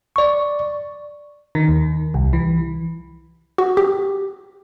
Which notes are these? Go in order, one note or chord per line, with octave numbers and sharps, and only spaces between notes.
D5 C#6
D#3
D#2
C2
E3
F#4
G4